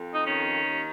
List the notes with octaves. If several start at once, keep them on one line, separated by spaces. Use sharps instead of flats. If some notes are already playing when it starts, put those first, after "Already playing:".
Already playing: F2
D#4
D#3 C#4
D#2